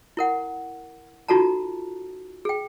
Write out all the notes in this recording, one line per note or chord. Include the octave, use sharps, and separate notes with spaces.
E4 A#4 F#5
D#4 F4 F#4 A4 A5 A#5
G#4 G5